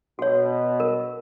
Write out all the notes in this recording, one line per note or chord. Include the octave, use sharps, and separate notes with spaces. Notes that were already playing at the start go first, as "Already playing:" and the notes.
B2 F#4 C#5
A#4